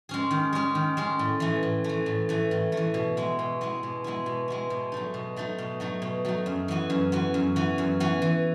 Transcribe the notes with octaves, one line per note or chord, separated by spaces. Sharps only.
G#3 C#4 G#4
D#3
G#3 C#4 G#4
D#3
G#3 C#4 G#4
A2
E3 A3
A2
A3
E3
A2
E3 A3
A2
A3
E3
B2
G#3 B3 E4
B2
G#3 B3 E4
B2
G#3 B3 E4
B2
G#3 B3 E4
B2
F#3 A3 D#4
B2
F#3 A3 D#4
B2
F#3 A3 D#4
B2
F#3 A3 D#4
F#2
E3 B3 F#4
F#2
E3 B3 F#4
F#2
E3 B3 F#4
F#2
E3 B3 F#4
E3